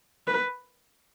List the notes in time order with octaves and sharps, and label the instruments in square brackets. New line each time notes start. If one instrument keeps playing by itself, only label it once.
[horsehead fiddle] B4